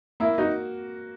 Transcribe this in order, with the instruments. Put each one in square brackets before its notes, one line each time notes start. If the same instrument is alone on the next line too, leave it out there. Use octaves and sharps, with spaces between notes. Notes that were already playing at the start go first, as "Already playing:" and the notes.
[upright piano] A#3 [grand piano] E4
[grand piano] D#4 [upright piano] F#4